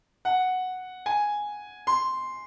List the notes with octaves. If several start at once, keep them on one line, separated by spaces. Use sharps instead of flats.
F#5
G#5
C6